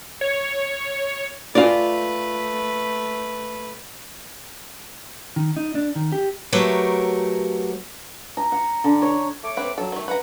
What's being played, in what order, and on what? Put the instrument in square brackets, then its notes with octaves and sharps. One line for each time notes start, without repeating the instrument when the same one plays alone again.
[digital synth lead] C#5
[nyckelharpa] A3 B4 [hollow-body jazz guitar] F4 D5
[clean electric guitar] D#3
D#4
D4
D#3
G4
[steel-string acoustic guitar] F#3 A3 G4 A#4 B4 C#5
[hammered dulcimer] A#5
F#5
D3
C#5
[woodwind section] A3 C#5 D6
[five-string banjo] C4 B4
[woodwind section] F#3 [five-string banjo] A4
[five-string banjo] D#3 A3
[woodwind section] F#3 F#5 [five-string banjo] B4 A#5